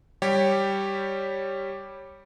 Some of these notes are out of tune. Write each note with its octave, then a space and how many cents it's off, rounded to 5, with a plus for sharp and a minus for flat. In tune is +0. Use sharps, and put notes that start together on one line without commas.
G3 +0 G4 +0 C#5 -10